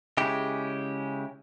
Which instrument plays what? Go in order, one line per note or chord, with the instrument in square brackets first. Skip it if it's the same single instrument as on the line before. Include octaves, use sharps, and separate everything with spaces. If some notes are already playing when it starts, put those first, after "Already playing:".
[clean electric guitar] C#3 G#3 E4 G4